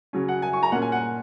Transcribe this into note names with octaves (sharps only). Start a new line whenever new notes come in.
C#3 F#3 C#4
F#5
G#5
C#6
A#5
A#2 A#3 C#4 F#5
G#5
F#5